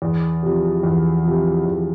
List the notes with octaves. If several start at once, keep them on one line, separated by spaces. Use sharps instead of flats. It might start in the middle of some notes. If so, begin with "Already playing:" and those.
E2
C3 F3
E2
C3 F3
E2